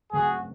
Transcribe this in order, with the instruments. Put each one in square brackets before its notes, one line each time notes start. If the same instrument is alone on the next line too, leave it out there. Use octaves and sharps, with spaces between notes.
[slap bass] C#3 F#3 A3 C4 [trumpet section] F#4 G#4